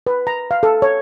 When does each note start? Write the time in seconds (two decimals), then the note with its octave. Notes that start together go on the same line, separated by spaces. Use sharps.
0.07 B4
0.27 A#5
0.51 F5
0.63 A4
0.82 C#5